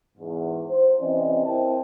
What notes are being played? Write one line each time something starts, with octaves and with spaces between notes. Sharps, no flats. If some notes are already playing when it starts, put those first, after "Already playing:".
E2 G#2
C5
C3 E3 C4 C#4 D5 D#5
C4 E4 A#4 C5 G5 A5